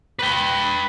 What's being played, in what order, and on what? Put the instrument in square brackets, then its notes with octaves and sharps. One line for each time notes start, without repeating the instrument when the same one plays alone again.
[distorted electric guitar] B4 G5